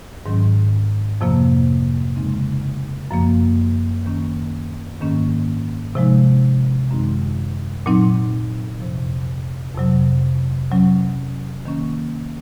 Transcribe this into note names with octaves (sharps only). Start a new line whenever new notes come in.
G#2 D#3 F#3 C#4
F2 C3 F3 A#3
C#3 G#3 C4 D#4
F#2 F3 A#3
D#3 A#3 C#4
G#2 D#3 A#3 C#4
C3 F3 G#3 D#4
F#2 D#3 G#3 C4 D#4
A#2 F#3 C4 D#4
F2 C3 F3
F2 C3 F#3
C3 F#3 C#4
D#3 A#3 C#4